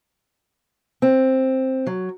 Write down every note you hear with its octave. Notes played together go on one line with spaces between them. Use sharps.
C4
F#3